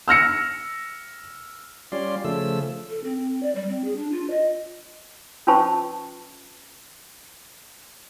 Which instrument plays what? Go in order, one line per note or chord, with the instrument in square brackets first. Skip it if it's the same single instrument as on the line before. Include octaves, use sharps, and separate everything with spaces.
[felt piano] E6 F6 A#6 C#7
[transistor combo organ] G3 C#4 F4 D5 C6
C#3 F3 A3 E6
[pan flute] A4
C4
C4
D5
G3
C4
G#4
D4
F4
D#5
[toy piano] C#4 F4 B4 C5 A5 C#6